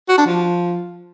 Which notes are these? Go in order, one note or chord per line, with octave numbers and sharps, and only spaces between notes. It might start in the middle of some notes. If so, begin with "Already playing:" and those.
F#4
D4
F3